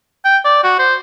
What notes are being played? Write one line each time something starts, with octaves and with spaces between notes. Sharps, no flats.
G5
D5
F#4
C5